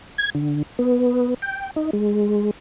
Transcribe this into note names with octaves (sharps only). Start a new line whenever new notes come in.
G#6
D3
B3
G5
D#4
G#3